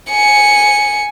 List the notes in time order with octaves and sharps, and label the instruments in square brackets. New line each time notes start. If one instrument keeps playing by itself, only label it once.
[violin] G#5 C#7